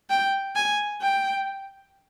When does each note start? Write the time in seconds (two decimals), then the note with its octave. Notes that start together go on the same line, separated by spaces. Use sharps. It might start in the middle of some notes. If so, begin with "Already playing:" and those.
0.10 G5
0.56 G#5
1.01 G5